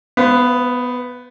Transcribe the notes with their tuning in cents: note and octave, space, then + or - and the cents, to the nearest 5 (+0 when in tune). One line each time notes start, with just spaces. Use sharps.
B3 +5 C5 -30 F5 -20